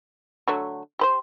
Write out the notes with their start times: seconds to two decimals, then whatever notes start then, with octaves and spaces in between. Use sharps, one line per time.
0.48 D3 F#3 A3
0.99 G4 B4 C5